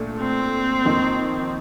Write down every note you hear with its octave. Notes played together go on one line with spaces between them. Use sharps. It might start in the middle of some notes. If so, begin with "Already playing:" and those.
Already playing: A#2 A3 D4
C4
F2 D#3 A#3 D#4